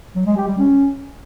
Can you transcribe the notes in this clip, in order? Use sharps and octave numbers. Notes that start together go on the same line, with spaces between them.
F#3
G#3
G4
G3
C#4